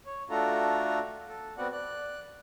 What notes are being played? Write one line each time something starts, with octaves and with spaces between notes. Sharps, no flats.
C#5
A3 D4 F4 F#4 A4 A#5
A4
B3 C4 F#4 D5 F#5
D5 F#6